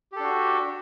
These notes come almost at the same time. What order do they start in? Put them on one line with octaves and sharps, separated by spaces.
G4 A4 D4 F#4